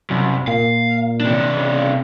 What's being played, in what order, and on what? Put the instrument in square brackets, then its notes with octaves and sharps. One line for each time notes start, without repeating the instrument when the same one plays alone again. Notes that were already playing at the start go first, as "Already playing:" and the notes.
[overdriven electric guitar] C2 [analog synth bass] F#2
[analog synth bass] A#2 [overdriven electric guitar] F5
[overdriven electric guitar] C3 D4
[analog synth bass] C#3